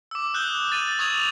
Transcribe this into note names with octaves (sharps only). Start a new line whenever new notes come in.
D6 E6
D#6 F#6 G6 G7
A6 D#7 F#7
C#6 D#6 G#6 F7 F#7